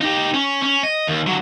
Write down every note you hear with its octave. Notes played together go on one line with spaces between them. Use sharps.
D#4 G4
C#4
C#4
D#5
D#2
D3 F#3